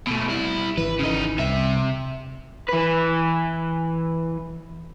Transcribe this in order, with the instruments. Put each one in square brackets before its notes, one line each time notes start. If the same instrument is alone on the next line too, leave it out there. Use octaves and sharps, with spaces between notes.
[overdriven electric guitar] B2 A3
G3 E4
[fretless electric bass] G#1 E3 [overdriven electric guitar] B4
[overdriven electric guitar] C#3 D#4
[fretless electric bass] C2 [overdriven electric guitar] C3 E5
[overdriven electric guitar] E3 B4